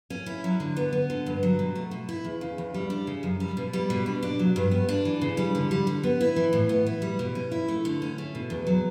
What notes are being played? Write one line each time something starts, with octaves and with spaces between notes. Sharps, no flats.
C#4
E4
F#3
D3
B3
B3
D3
G2
F#3
B2
A3
B2
E4
E2
C#3
E2
G3
D4
C#3
F#2
G3
B2
G3
B2
D4
D4
F#3
G2
B3
D4
E3
C#3
G3
D3
G3
D3
B3
E4
E3
A2
B3
E4
G3
B2
C#4
E4
A3
D3
C#4
A3
B2
E2
F#3